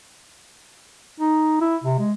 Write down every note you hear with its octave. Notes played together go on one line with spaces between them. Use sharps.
D#4
E4
C3
G#3